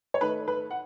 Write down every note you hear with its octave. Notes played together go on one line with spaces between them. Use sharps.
C#5
D#3 A3 D#4 B4
B4
F#5